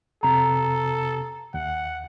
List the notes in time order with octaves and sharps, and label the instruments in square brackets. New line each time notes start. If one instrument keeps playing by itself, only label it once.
[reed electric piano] F2 C3 [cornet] A4 [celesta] A#5
[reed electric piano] D#2 [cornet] F#5